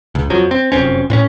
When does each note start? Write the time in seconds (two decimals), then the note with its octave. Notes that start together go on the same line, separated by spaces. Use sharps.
0.15 C#2
0.30 F2 F3 F#3
0.51 C4
0.72 F1 F#2 C4 C#4
1.10 A2 C4 C#4